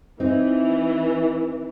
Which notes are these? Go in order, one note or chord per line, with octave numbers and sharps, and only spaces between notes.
E3 C4 D#4